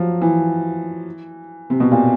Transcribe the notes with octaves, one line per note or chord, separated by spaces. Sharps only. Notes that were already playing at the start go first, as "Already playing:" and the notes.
Already playing: F3 F#3
E3
C3
B2
A#2